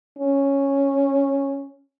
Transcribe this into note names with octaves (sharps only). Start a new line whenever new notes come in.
C#4